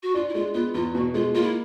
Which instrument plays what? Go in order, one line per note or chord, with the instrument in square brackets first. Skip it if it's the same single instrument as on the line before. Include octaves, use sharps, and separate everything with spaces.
[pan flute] F#4
[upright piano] D4 [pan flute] F4
[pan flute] E4
[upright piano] G#3 [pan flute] F4
[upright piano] B3 [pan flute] F4
[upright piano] E2 [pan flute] F4
[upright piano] B2 [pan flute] F#4
[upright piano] G#3 [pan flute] F4
[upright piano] A#3 [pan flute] F4
[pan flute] E4